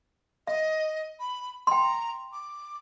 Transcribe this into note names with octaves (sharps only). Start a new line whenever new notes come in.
D#5 E5
B5
G5 A#5 C6
D6